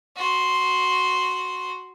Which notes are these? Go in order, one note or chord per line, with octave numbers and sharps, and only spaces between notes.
F#4 C6